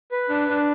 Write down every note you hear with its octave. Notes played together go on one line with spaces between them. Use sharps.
B4
D4
D4